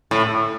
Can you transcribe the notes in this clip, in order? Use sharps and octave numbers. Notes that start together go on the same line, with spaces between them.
A2